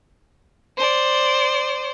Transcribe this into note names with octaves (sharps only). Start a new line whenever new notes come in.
C5 D5